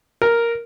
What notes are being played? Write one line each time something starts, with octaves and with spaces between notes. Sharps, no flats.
A#4